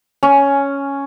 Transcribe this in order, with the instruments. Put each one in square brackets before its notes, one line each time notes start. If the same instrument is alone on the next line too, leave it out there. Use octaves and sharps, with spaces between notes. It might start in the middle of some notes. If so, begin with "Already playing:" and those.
[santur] C#4